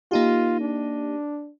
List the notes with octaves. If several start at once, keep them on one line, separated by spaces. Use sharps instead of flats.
A#3 D#4 F4 G4
D4